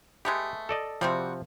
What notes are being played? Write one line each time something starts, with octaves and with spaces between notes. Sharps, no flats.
G#3 A3 B3 G4
A4 D5 D#5
C3 F3 G3 C4 F#4